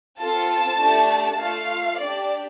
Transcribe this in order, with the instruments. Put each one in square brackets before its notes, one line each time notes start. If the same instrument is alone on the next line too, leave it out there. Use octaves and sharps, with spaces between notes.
[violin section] C4 F4 A4 A5
A3 D4 G4
A3 F4 A4 F5
D4 G4 D5